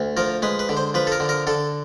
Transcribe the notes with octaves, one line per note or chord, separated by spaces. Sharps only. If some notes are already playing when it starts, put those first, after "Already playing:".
Already playing: D2
F3 A#4
G#3 B4
B4
D3
C5
F3 B4
A4
A#4
D3
A#4
D3 A4